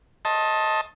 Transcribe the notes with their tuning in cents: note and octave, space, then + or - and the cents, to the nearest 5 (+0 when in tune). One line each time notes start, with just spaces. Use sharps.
D#5 +20 A5 +0 C6 +40